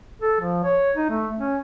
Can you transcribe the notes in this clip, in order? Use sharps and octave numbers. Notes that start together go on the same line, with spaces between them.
A4
F3
C#5
D#4
A3
C#4